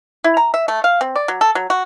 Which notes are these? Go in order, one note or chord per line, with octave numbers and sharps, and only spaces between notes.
E4
A#5
E5
A3
F5
C4
D5
F#3
A4
F#3
F#4